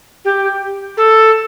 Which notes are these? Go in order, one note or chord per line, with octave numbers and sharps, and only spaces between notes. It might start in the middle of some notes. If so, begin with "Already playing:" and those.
G4
A4